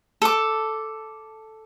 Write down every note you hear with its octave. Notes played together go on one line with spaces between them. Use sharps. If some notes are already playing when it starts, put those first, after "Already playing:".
A4 D6